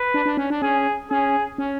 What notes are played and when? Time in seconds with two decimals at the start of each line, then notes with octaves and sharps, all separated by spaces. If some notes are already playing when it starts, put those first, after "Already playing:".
Already playing: B4
0.14 D4
0.26 D4
0.37 C#4
0.50 D4
0.62 C#4 G#4
1.10 C#4 G#4
1.58 C#4